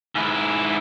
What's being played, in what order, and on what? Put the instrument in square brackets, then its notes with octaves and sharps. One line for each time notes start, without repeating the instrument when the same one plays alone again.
[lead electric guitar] G#2 E4